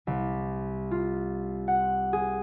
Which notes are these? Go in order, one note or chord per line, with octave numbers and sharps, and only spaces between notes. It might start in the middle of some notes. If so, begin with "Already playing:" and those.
C2
F4
F#5
G#4